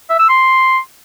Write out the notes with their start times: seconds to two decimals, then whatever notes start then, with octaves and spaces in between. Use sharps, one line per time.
0.10 E5
0.19 E6
0.29 C6